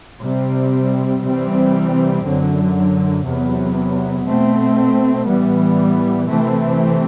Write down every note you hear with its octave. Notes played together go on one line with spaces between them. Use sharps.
C3 G3 C4
C3 E3 G3 C4
F#2 D3 F#3
E2 C3 F#3 B3
B2 A3 C4
A2 E3 G3 B3
C3 E3 A3 C4